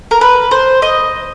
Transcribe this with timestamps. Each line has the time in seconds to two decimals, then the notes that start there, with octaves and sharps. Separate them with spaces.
0.11 A#4
0.21 B4
0.51 C5
0.82 D#5